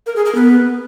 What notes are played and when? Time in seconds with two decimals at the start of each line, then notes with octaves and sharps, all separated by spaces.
0.06 A#4
0.16 G#4
0.25 A#4
0.35 B3